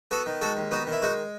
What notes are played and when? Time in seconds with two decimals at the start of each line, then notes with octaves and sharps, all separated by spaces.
0.11 B3 F#4 A4
0.26 D#3
0.41 G#3 F#4 A4
0.57 D#2
0.71 B3 D#4 F#4
0.87 D#3
0.92 E4
1.02 G#3 D#4 F#4